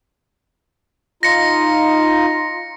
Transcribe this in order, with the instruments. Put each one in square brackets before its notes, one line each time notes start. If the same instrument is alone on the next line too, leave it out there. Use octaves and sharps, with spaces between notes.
[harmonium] D#4 F4 [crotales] A#6 C#7